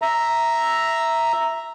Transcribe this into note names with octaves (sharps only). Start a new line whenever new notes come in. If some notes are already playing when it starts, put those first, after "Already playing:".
E5 A#5